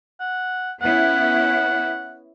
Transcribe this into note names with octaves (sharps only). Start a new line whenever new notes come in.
F#5
B3 C#4 E4 F#5